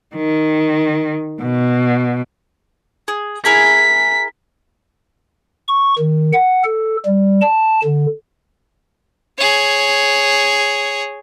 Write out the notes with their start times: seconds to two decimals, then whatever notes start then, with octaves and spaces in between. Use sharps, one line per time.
0.15 D#3
1.41 B2
3.08 G#4
3.45 E4 G#4 A#4 B6
5.68 C#6
5.98 D#3
6.33 F#5
6.64 A4
7.06 G3
7.42 A5
7.84 D3
9.38 G#4 C#5